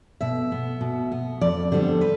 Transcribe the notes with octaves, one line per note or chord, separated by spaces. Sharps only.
B2 E5
B3
B2
B3
F2 D5
D3 G3 B3 C5
B4